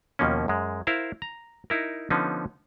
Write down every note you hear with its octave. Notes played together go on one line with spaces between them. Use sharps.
D#2 B2 F3 A#3 C#4
F#2 G#3
E4 A#4 C5 F5
A#5
D#4 E4 A#4
D3 F3 B3 C#4 D#4